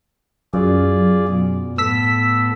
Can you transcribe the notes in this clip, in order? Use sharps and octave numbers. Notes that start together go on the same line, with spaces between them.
F#2 F4 G#4 D5
B2
A2 B3 A4 E6 B6